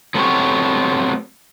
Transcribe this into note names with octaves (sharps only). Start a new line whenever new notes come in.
F#3 A3 B3 C4 G4 C#5